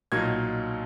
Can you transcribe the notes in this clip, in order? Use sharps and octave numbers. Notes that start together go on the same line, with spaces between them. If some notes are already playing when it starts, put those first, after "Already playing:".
B1 A#2 F#3 A#3 D#4 G#6